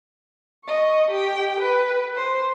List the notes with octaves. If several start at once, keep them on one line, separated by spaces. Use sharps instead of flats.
D#5 C#6
G4 G5
B4
C5